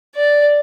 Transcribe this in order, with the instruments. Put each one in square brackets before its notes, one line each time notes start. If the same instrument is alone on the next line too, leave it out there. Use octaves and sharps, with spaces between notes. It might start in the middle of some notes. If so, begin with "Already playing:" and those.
[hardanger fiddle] D5